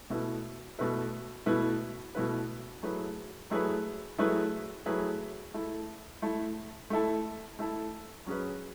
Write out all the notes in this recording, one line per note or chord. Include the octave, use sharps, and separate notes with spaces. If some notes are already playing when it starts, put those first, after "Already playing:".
B2 A3 E4 B4
B2 A3 E4 B4
B2 A3 E4 B4
B2 A3 E4 B4
F#3 A3 E4 G#4 B4
F#3 A3 E4 G#4 B4
F#3 A3 E4 G#4 B4
F#3 A3 E4 G#4 B4
A3 E4 A4
A3 E4 A4
A3 E4 A4
A3 E4 A4
F#3 C#4 G#4 B4